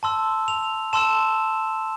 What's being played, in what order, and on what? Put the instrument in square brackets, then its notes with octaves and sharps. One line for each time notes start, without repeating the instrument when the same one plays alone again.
[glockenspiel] A5 C6 E6
F7
A5 C6 E6 E7